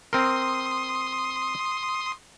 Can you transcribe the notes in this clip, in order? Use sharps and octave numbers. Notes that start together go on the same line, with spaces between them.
C4 A#4 C6 D#6